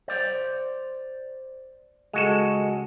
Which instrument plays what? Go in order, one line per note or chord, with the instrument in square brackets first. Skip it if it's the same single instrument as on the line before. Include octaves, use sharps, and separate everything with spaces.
[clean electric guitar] C5 D5
[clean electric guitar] C#2 [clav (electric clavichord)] G#3 F#4 A4